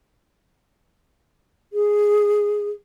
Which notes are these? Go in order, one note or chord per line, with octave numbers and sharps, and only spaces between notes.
G#4